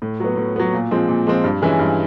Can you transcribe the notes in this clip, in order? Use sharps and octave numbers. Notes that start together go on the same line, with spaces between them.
A2
F#3 B3
A2
F#3 B3
A#2
F3 G#3 C4
A#2
F3 G#3 C4
G2
E3 G#3 C#4 E4
G2